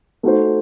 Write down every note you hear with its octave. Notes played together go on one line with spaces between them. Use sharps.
A3 D#4 F#4 C5